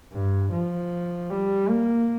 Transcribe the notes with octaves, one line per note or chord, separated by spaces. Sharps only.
G2
F3
G3
A#3